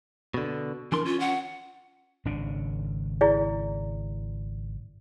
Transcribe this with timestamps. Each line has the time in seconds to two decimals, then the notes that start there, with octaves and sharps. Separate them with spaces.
0.34 B2 D3
0.92 E3 D4 A#4 C6
1.05 C#4 F4
1.20 F#5
2.25 G#1 C#3 D4
3.21 E4 G#4 D5